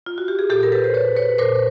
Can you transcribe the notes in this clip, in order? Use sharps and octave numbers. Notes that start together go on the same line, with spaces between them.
F4
F#4
G4
G#4
A#2 G4 A4
A#4
A4 B4
C5
B4 C#5
B4 C#5
A#2 A#4 C5